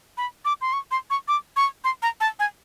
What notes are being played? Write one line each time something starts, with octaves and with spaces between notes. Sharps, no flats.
B5
D6
C6
C#6
C6
C#6
D6
C#6
C6
A#5
A5
G#5